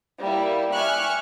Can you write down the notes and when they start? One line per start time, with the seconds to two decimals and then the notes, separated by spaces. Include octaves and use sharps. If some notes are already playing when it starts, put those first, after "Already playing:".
0.19 G3 A#3 E4
0.73 E5 G#5 C#6 D6 F6 F#6